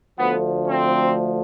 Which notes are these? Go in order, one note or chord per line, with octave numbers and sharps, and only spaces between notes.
D2 D3 F3 A3 B3
C4